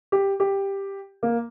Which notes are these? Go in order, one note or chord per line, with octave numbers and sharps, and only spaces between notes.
G4
G4
A#3